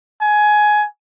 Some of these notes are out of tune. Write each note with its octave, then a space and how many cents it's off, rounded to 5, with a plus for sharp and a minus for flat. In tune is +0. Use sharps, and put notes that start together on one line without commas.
G#5 +15